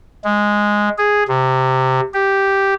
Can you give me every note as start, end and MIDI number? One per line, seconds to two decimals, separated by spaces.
0.24 0.89 56
0.98 1.23 68
1.28 2.00 48
2.14 2.74 67